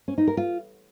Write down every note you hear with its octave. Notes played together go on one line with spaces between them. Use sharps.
C#4
D#4
A#4
F4